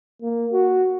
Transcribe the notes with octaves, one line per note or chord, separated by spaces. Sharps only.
A#3
F#4